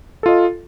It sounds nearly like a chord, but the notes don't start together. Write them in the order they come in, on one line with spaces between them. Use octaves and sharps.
A4 F4 D#5